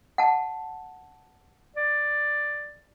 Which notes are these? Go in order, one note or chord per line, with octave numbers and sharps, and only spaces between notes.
F#5 A5
D5